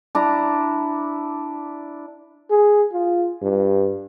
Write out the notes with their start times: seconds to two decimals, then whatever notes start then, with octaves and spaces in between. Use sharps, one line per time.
0.15 D4 E4 A#5
2.50 G#4
2.93 F4
3.42 G2